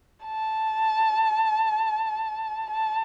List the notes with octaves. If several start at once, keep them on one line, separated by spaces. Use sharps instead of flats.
A5
A5